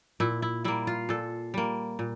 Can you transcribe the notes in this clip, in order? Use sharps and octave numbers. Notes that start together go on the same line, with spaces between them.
A#2 E4
E4
G3 A#3 E4
F4
A#2 A4
G3 A#3
A#2